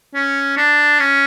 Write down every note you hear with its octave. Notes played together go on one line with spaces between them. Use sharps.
C#4
D4
C#4